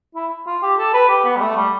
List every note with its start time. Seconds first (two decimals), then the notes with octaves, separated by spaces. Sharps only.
0.15 E4
0.46 F4
0.62 G4
0.78 A4
0.94 B4
1.09 G4
1.25 B3
1.36 G3
1.41 A3
1.56 G3